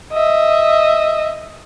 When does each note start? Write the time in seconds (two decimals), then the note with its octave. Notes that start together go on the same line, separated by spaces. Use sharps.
0.13 D#5 E5